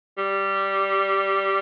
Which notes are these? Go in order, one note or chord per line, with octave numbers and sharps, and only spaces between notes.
G3